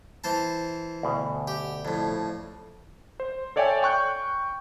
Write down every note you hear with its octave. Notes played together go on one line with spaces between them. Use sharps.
E3 C5 A5
D2 B2
G4
F2 A2
C5
A4 C#5 D5 E5 G5 G#5
G5 C#6 F#6 G6